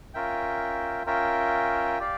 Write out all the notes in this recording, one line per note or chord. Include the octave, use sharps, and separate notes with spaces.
C#4 F4 A#4 E5 G5
C#4 F4 A#4 E5 G5
G4 D5 F5